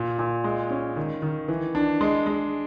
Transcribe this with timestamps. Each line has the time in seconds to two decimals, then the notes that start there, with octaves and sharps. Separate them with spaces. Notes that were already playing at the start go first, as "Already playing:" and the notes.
Already playing: A#2
0.19 A#2
0.44 G#3
0.70 C#4
0.96 D#3
1.22 D#3
1.48 E3
1.75 D4
2.01 G#3
2.27 G#3